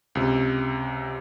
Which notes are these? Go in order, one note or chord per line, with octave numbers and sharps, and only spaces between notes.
C#2 C3